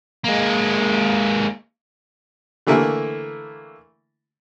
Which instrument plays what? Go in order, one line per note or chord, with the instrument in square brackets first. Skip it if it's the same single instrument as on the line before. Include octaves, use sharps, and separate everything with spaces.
[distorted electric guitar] G#3 A#3
[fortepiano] D3 E3 A3 A#3 E4